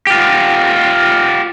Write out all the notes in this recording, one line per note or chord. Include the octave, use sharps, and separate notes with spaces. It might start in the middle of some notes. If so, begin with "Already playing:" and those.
F4 G4